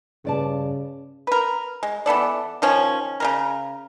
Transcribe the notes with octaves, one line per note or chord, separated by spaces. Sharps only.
G2 C#3 D5 A5
A#4 B4
G#3
E3 B3 A4 D5
D#3 F3 C#4
C#3 G3 A#4